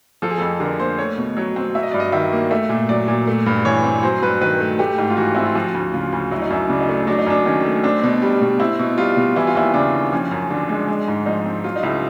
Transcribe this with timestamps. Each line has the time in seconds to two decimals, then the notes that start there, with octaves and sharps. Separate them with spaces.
0.22 F3 A4
0.30 G#4
0.38 F2 A4
0.60 D3 A#4
0.79 A#3 C5
0.98 A3 C#5
1.18 B2
1.37 F#3 C#5
1.56 C4
1.75 F#3 E5
1.83 D#5
1.92 G2 D5
2.00 D#5
2.12 D#3 E5
2.32 A#3
2.51 A3 E5
2.69 A#2
2.89 F#3 D5
3.08 A#2
3.27 A3
3.46 G2
3.65 E3 C#5
3.84 C4
4.03 F#3 C5
4.22 G2 B4
4.41 D#3 B4
4.60 A3
4.79 A3 G4
4.98 G#2
5.10 F4
5.17 E3 F#4
5.35 C4 E4
5.46 F4
5.55 F3 F#4
5.74 D2
5.94 C#3 F4
6.13 D2
6.31 F#3 E4
6.42 D#4
6.50 F#2 E4
6.69 C#3 D4
6.80 D#4
6.89 A3 D4
7.07 F#3 D4
7.19 D#4
7.26 F#2 D4
7.46 D#3 C#4
7.65 A3
7.84 C4 D4
8.02 B2 D4
8.22 G3
8.41 B2
8.60 C4 E4
8.79 B2
8.98 G3 F4
9.17 B2
9.36 E3 E4
9.47 F4
9.55 D#2 E4
9.74 C#3 D4
9.93 D#2
10.12 F3 C#4
10.31 F#2
10.50 D3 D4
10.69 G#3
10.88 G#3
11.08 G#2
11.26 F3 D#4
11.46 C4
11.64 F#3 F4
11.76 D#4
11.83 C#2 E4